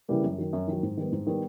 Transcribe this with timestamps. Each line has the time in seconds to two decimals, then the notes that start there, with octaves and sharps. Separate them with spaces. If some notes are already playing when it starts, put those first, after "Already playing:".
0.09 C#3 E3 G3 A#3
0.24 F#2
0.38 D#3 F#3
0.53 F#2
0.68 D#3 F#3
0.83 G#2
0.97 D#3 G3 B3
1.12 G#2
1.27 D#3 G3 B3